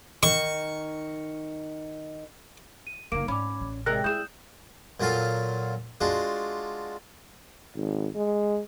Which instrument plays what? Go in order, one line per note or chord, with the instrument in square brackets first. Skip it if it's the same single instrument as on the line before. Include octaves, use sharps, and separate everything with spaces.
[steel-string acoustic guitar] D#3 [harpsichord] C#6
[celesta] D#7
[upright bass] F#1 D#4 [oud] A#3 [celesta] D6 D7
[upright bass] G#2 [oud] C#4 [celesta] B5 D6
[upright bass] A1
[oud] C3 D#4 A#4 [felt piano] G#3 F#6 [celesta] A#6
[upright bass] G#3 [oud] E4 F#4 G#4 [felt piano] D#6 [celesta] G6 E7
[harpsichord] A#2 F#3 F4 A4 F5
G#3 D4 F4 F#4
[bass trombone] G#1
G#3